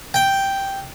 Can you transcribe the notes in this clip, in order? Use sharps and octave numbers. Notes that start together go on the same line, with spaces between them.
G5